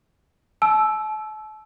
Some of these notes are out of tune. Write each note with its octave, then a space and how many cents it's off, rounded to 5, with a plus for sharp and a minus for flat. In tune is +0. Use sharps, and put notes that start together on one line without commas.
A5 -40 E6 +0